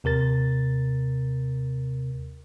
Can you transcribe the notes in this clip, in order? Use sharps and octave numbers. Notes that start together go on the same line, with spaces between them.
D#2 C3 A#4 A6